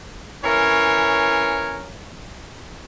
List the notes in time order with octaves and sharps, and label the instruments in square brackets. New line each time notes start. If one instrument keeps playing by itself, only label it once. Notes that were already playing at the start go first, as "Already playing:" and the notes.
[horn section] E3 C#4 A#4 C#5